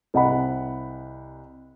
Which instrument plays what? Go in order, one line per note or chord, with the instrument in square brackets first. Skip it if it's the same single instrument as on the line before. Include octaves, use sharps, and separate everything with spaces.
[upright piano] C2 D#5 F#5 B5